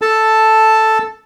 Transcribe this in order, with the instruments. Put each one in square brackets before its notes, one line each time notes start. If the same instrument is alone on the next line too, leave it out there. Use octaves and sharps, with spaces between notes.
[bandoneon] A4 A5